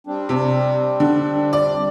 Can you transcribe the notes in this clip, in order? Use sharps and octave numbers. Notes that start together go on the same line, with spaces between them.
G3 C4 D4
C3
D3
D5